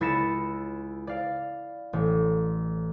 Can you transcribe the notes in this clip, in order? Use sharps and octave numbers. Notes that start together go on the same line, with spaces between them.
C#2 E4 A6 A#6 C#7 E7
D5 F5
A1